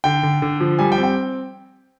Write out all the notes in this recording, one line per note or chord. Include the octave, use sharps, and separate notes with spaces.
D3 G5
D3
D3
F3
G3 G#5
G5
C4
G5